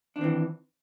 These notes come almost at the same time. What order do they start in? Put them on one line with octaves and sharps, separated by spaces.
D4 D#3 C4 E3